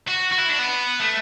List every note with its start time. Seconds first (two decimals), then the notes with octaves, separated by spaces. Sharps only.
0.08 F#4
0.32 F#4
0.39 E4
0.49 D4
0.59 B3
0.99 A3